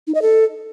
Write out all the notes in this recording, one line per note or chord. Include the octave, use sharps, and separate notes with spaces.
D#4
D#5
A4